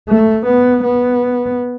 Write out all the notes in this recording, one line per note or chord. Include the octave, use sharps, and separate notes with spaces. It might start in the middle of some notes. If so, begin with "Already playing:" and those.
A3
B3
B3